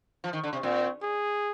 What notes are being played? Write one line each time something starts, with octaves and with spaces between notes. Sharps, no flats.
F3
D#3
D3
C3
A#2 C4
G#4